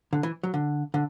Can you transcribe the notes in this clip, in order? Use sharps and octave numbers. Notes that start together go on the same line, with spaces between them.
D3
E3
F#3
D3
D3